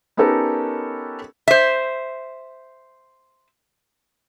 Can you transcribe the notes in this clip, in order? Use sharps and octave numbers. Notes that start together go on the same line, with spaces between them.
B3 C#4 D#4 G4 A4 A#4
C5 E5